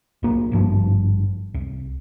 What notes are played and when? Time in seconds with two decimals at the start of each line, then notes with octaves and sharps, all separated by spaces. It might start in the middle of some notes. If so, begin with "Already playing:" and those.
0.23 B1 A#3
0.51 G#1 G2 F3
1.54 C2